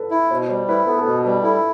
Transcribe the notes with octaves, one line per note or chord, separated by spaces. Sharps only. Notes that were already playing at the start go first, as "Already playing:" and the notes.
Already playing: A4 B4
E4
B2 C5
G3 C5
E4 B4
B3 A4
A4
B2 B4
G3 B4
E4 A4